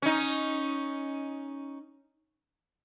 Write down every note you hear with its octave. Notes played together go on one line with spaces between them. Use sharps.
C#4 D#4